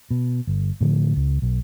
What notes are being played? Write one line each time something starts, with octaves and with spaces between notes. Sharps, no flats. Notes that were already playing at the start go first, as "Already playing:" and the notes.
B2
G1
A2 D3 F3
C#2
B1